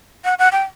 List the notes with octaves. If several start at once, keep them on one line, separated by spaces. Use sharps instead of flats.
F#5
F#5
G5